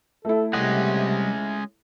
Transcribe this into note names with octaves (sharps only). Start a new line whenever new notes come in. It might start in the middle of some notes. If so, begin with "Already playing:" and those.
A3 E4 A4
C3 G3 G#3 C#4 D#5 F#5